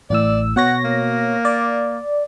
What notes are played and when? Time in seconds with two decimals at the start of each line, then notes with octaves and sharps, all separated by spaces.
0.10 A1 A2 D5 E6
0.56 B2 C#5 F#5 A#6
0.84 A#3
1.45 D5